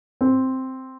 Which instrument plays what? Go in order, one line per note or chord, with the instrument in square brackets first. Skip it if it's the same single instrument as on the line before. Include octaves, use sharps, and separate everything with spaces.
[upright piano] C4